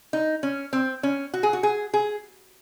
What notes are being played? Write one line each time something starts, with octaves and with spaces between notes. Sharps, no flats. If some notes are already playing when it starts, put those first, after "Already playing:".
D#4
C#4
C4
C#4
F#4
G#4
F#4
G#4
G#4